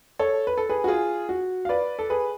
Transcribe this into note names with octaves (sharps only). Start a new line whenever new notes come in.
A4 C#5
B4
A4
G#4 B4
F#4
F4 G#4
F#4
F5
B4 D5
A4
G#4 B4